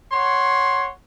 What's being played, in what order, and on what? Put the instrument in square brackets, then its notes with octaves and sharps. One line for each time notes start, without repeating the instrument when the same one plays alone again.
[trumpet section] C#5 F#5 C6